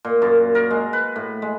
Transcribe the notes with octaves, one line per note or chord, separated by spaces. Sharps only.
A#2
F#2
A#4
G#3
B4
A2
G#3